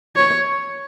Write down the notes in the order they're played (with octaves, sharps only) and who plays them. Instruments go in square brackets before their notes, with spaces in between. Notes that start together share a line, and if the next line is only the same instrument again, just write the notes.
[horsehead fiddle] C#5